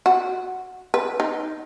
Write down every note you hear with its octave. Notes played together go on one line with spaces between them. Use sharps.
F#4
B4
D#4